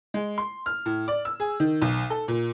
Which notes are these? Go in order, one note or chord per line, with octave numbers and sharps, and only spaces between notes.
G#3
C6
F6
A2
D5
E6
G#4
D#3
B1
A4
A#2